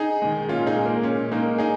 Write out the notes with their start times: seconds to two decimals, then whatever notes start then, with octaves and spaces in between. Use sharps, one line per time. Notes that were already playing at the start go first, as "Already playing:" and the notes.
Already playing: D#4 G#4
0.22 D#3 G#3
0.48 A#2 C#4 F4
0.67 D#4 G#4
0.77 G#3
0.86 A#3
1.03 A#2 C#4
1.31 G#3 A#3 D#4
1.58 D#4 G#4